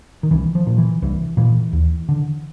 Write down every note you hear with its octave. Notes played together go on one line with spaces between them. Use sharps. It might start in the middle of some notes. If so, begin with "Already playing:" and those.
D#3
C2 E3
F3
A#2
E3
C2 E3
A#2 E3
D#2
D3